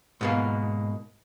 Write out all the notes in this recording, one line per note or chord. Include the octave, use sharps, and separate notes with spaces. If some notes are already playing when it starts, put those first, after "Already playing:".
G#2 B2 A#3